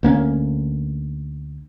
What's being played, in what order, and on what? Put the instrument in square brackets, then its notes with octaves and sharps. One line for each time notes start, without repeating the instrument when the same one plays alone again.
[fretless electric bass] D2 A#3 C#4